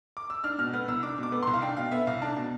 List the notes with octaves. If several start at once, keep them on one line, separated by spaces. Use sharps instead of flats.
D6
E6
D4 F6
B2 F6
B3 F6
C2 E6
D4 D6
B2 D6
B3
C2 C6
F5
D4 G5
B2 F5
B3 E5
C2 F5
D4 A5
B2